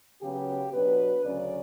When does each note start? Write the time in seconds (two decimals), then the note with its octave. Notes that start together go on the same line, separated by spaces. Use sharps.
0.22 C#3 F#3 B3 G4
0.73 B2 F#3 B3 D4 B4
1.25 D2 C#3 F#3 C#4 D5